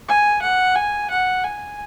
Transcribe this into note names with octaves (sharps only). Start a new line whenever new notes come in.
G#5
F#5
G#5
F#5
G#5